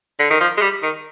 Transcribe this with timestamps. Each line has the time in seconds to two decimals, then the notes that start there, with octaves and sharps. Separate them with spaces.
0.19 D3
0.30 D#3
0.40 F3
0.57 G#3
0.62 G3
0.83 D#3